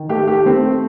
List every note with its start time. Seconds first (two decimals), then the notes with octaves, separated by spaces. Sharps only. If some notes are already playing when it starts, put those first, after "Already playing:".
Already playing: D#3
0.09 A3 G4
0.27 G4
0.45 A3 C4